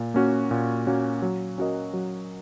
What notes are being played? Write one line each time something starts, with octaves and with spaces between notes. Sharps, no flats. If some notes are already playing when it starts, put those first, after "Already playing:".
Already playing: A#2
A#3 C#4 F#4
A#2
A#3 C#4 F#4
F#3
C#4 F#4 A#4 D#5
F#3